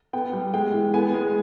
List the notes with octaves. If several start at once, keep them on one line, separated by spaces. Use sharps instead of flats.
B3 G5
G3
G#3 G5
E3
B3 G#5
G#3